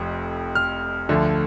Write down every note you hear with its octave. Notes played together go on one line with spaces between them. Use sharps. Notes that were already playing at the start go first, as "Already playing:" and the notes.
Already playing: F1 F2
F6
D2 D3 F3